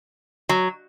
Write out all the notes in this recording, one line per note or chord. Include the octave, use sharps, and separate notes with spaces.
F#3